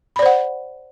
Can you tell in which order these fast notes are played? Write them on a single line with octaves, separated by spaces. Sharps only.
B5 D5 C5 F#5